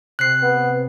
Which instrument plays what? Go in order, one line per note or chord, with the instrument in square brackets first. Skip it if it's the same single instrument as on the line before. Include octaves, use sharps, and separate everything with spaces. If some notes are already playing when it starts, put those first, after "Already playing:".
[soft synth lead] C3 [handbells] F#6 C7
[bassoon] B3